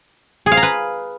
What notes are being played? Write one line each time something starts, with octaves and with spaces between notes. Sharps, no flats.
G#4
F5
A#5
B4